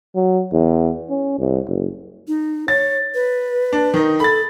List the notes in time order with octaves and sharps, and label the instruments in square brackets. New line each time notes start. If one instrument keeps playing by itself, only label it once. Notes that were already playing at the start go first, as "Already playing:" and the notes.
[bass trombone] F#3
E2
C#4
C2
F#1
[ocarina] D#4
[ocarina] C#5 [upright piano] A6
[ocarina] B4
[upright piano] D4
D#3 D#4
[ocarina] A4 [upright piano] B5 A6